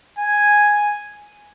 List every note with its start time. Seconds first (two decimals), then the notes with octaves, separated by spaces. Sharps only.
0.19 G#5